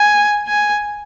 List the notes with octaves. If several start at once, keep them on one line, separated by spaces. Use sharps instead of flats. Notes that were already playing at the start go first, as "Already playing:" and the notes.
Already playing: G#5
G#5